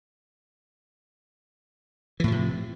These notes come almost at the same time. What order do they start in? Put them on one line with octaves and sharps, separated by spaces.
E3 A2 F3 C3